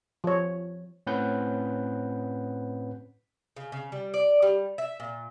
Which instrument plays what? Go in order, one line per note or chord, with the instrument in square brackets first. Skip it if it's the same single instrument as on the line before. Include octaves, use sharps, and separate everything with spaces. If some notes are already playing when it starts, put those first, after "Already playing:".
[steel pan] F3 C#5
[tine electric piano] A2 C4 C#4 B4 F#5 G6
[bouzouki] C#3
C#3
G3
D5
G3
E5
A#2